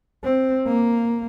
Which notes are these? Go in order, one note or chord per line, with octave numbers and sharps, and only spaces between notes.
C4
A#3